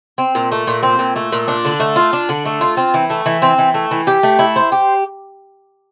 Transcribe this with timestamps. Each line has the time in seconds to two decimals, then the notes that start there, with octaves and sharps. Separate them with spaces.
0.18 C4
0.35 A#2
0.52 A3
0.67 A#2
0.83 C4
0.99 A#2
1.16 A3
1.32 A#2
1.48 D4
1.65 D3
1.80 A3
1.96 F4
2.13 D4
2.29 D3
2.45 A3
2.61 F4
2.77 C4
2.94 E3
3.10 A3
3.26 E3
3.42 C4
3.58 E3
3.74 A3
3.91 E3
4.07 G4
4.23 A3
4.39 E4
4.56 C5
4.72 G4